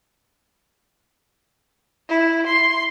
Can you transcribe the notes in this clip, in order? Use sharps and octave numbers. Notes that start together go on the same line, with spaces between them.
E4
C6